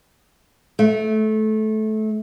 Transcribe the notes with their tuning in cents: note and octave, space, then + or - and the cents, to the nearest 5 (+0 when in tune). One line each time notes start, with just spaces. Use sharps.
A3 -20